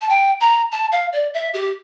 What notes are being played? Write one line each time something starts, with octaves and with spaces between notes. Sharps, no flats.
A5
G5
A#5
A5
F5
D5
E5
G4